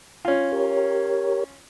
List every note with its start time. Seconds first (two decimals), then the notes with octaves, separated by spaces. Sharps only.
0.25 C#4 F4
0.52 G4 A#4 C#5